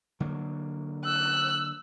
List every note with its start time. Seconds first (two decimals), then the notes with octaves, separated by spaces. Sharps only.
0.20 D3 F#3 A#3
1.05 E6 F#6